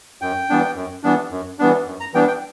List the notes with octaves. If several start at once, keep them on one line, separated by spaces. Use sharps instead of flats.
F#2 G5
E3 G3 B3 D4
F#2
E3 G3 B3 D4
F#2
E3 G3 B3 D4
F#2
A#5
E3 G3 B3 D4 G5
G5